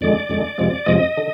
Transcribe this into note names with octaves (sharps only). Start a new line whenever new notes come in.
F2 D3 G#3 D5
F2 D3 G#3
F2 C3 F3 G#3
F2 C3 F3 G#3 D#5
D3